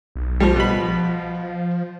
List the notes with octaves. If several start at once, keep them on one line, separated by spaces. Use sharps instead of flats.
B1
F3 G3
A#1 B2 B5
F3